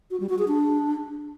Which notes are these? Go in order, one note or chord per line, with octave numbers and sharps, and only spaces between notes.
F#4
G3
F#4
G#4
D4